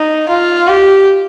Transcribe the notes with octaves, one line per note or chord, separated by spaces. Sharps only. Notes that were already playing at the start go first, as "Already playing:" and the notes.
Already playing: D#4
F4
G4